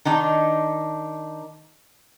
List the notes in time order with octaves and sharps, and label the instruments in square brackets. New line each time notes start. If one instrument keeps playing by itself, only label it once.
[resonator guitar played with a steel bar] D#3 D4 D#4